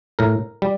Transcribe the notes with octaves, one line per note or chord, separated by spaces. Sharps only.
A2 A#4
G3